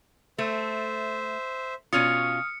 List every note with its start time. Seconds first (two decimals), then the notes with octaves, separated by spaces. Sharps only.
0.38 A3 C5 E5
1.93 B2 C#4 F4 D#6 F6 C#7